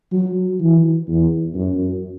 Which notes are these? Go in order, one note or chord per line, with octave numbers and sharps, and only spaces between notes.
F#3
E3
E2
F#2